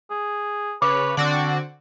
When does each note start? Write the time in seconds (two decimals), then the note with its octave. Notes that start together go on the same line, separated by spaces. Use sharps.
0.10 G#4
0.82 C#3 B4 C#5 D6
1.17 D3 C4 D4 F#4 D5